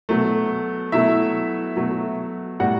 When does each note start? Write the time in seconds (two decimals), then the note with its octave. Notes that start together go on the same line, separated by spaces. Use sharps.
0.09 B2 F#3 A3
0.92 B2 F#3 A3 E4 E5
1.76 B2 F#3 A3
2.60 A2 G3 F#4 F#5